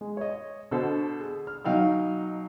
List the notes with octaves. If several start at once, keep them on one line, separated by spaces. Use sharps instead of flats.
G#3
C#5 D#5
B2 D3 F#4 A4 C5
G#4
F6
B2 F#3 D#4 F5 G5 E6